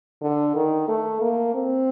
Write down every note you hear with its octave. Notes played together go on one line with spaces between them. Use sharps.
D3
D#3
A3
A#3
C4